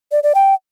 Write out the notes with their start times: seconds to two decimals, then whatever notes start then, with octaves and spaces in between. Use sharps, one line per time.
0.12 D5
0.23 D5
0.35 G5